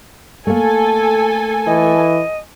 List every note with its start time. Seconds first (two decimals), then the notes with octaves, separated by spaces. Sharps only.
0.47 A3 A#3 A4 G#5
1.67 E3 D#5